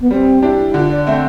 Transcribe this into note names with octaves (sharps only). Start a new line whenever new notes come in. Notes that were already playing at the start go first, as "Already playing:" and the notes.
B3
G3 C4
D4 E4 G4
D3 F4
D5
A3 C4 E5